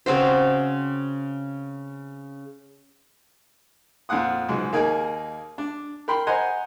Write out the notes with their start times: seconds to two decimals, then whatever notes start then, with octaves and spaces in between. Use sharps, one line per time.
0.06 C#3 C4 F#4 C5
4.09 F2 A#2 F5 F#5 D#6
4.49 C#2 G#2 F#3
4.72 D#2 A#3 D#4 G#4 A#4 G#5
5.58 D4
6.08 A#4 G5 B5 C6
6.27 C5 D#5 F#5 G#5 A#5